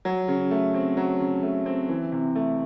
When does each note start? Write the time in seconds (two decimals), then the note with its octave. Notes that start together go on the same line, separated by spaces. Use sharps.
0.05 F#3
0.28 C#3
0.51 A3
0.74 C4
0.97 F#3
1.20 C#3
1.43 A3
1.66 C4
1.89 E3
2.12 C3
2.35 A3